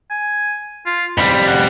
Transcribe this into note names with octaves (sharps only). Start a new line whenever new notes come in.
G#5
F4
F2 G3 B5
F#5